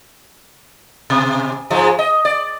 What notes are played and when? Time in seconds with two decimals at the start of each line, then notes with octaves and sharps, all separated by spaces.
1.10 B2
1.70 G#2 F3 G#3
1.99 D#5
2.25 D5